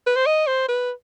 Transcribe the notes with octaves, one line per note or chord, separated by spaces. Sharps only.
B4
C5
D#5
C5
B4